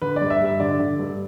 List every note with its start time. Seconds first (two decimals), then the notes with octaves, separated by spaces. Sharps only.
0.02 D3 B4
0.16 G2 D5
0.30 E5
0.41 G2 E5
0.60 D3 D5
0.79 D3
0.99 G2